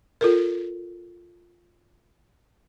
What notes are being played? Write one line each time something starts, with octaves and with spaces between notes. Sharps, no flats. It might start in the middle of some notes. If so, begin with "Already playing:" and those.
F4 A4 A#4